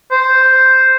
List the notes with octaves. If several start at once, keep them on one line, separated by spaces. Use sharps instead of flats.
C5